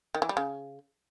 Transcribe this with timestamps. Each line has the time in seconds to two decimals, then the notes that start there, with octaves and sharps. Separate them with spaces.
0.15 D#3
0.22 E3
0.29 G3
0.37 C#3